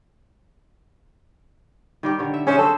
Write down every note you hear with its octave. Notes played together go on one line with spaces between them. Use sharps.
D#3 G3 G4
D3 C#5
E5
C#4 G#4 C5 E5
C4 C#4 A4 C5